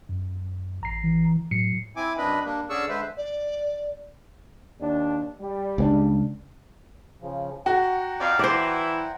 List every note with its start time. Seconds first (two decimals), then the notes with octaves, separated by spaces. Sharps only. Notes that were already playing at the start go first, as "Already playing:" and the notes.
0.09 F#2
0.81 A1 A#5 C7
1.04 E3
1.51 A2 F#3 C7 C#7
1.96 C4 E4 G#5 D6
2.18 F#2 C4 D4 B4 D#5 B5
2.45 G3 A#3 D4
2.70 D3 C#4 G#4 D5 C#6 E6
2.89 D3 G#3 B4 C5 E5
3.17 D5
4.80 D#2 D4
5.40 G3
5.78 C#2 C4 D4
7.22 C#3 F3
7.66 F#4 F#5 G5 A#5
8.21 F2 D5 F5
8.39 E3 E4 C5 D5